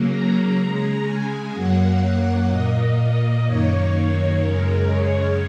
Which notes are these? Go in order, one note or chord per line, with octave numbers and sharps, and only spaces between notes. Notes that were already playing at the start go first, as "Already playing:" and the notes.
Already playing: C#3 F#3 A#3
A#5
C#3 G#3
G#5
F#2 F#3 A#3 F#5
A#2 A#3 D#5
F#2 D#3 A#3 C#5
F#2 C#3 G#3 A#4
C#5